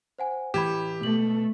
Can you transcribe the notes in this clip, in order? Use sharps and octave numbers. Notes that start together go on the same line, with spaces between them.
C5 F#5 G#5
A2 E3 A3 G4 B5 G#6 E7
B2 A3 F#7